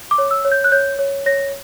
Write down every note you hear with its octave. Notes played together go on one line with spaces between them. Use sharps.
D6
C#5
E6
C#5
G6
F#6
C#5 G6
C#5
C#5 A#6